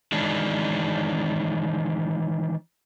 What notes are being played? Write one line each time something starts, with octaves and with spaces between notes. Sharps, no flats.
D#3 E3 G#3 D4